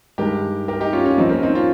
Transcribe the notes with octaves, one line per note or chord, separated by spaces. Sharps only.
G2 D#3 G#3 G4 A#4
G4 A#4
D#4 G4
C#4 F4
C#4 F4
F2 D#3 G3 C4 D#4
A#3 C#4
C4 D#4
C#4 F4